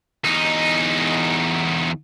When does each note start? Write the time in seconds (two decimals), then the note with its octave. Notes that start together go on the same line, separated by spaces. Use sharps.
0.24 E2 D#4